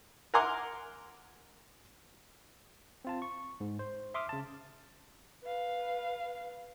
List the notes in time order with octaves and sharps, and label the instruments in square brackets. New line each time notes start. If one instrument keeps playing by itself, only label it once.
[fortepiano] A#4 F#5 G#5 A#5 C6 D6
[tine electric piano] C4 F4 A5
C#6
G#2
C5
E5 C6 D6 D#6 F6
C#3 A5
[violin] B4 F5